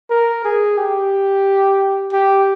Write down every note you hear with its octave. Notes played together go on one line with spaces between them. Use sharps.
A#4
G#4
G4
G4